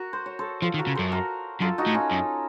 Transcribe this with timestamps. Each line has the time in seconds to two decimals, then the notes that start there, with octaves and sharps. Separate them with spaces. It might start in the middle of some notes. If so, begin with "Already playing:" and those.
Already playing: F#4 A#4
0.13 C5
0.26 C#5
0.39 A4 C5
0.62 F3 F4 A4
0.74 D#3
0.79 F#4 A#4
0.87 C#3
0.95 F#2 A4 C5
1.12 F#4 A#4
1.61 F#2 F4 A4
1.78 D#4 F#4
1.87 A2
1.94 C#4 F4
2.11 F#2